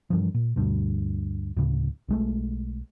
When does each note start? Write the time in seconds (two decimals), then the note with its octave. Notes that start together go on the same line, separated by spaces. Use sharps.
0.10 G2 C#3 E3 F3
0.34 A#2
0.56 D2 G2 B2
1.57 D2 A2 C#3
2.08 B1 G#3 A3